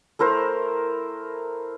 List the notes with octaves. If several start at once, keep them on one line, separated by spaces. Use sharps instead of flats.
A3 E4 A#4 C5